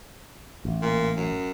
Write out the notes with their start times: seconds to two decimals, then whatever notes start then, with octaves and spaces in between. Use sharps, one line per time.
0.65 A1
0.82 A#2
1.17 F#2